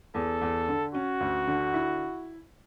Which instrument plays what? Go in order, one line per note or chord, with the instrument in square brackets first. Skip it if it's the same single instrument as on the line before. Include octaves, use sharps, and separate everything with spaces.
[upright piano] E2 [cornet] A4
[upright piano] E2
D3
[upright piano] C#4 [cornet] F#4
[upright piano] D2
D3
E4